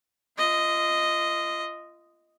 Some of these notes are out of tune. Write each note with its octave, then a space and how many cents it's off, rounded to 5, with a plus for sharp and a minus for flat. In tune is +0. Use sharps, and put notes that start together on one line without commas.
F4 -25 D#5 +0